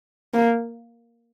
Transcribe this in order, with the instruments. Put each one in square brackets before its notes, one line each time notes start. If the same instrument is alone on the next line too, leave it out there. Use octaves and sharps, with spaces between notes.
[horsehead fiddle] A#3